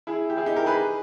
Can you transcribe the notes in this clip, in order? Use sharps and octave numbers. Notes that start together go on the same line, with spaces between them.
E4 G#4
G4
E4 G#4
D#4 G4
G4 A#4
G#4 B4